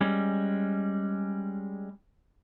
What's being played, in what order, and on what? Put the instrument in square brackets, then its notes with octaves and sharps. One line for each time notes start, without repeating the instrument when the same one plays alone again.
[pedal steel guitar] G3 G#3 C#4